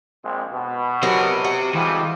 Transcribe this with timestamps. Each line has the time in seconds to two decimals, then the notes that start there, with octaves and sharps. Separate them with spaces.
0.23 A#1 G#3 C4
0.52 B2
1.03 F#3 F#4 G4 A#4 C5
1.44 F#4
1.75 F2 E3 G3 G#3